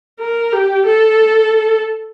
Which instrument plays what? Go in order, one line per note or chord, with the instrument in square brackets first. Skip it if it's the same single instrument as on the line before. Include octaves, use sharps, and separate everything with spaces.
[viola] A#4
G4
A4